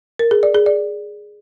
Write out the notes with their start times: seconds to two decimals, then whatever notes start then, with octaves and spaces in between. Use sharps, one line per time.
0.19 A#4
0.31 G#4
0.43 D5
0.55 G#4
0.66 D5